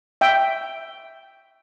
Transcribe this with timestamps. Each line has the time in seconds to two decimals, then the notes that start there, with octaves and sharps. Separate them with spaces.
0.21 E5 G5